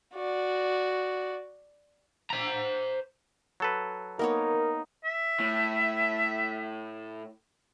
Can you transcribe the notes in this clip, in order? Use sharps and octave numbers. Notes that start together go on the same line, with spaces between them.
F#4 D5
C5 A#5
F#3 A4 B4
A#3 B3 D#4 A#4 C#5
E5
A2